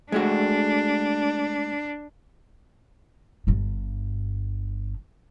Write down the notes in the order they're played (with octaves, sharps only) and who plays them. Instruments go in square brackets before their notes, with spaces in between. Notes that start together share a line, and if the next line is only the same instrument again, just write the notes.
[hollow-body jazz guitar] G#3 A3 F#4 [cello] D4
[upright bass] G1 G2